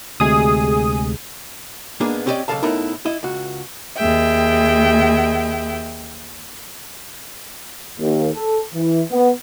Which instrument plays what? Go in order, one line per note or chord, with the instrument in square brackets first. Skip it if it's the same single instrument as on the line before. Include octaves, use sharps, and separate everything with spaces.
[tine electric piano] D2 C3 G#3 [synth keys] G#4 D#6
[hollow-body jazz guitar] G#2 A#3 B3 D4 G#4
C4 C#4 G4 A4 D5 D#5
B1 A#2 C#3 A4 F5 A5
A2 B3 D#4 E4 A4 A#4
E4 D#5
C#2 F#4
[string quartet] D#2 G#4 E5 G5
[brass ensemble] D#2
A4
E3
B3